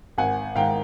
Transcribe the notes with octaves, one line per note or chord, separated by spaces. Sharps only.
G#1 F#5 G#5
G#2 D#3 F5 G5